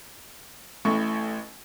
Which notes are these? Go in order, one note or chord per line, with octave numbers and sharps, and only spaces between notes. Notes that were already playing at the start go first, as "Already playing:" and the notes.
A1 A2 C#6